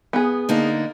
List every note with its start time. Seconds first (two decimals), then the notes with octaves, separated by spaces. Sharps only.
0.13 B3 G#4
0.49 D3 A#3 D#4